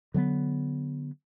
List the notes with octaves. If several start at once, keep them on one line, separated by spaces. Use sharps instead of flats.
D3 F#3 G3 B3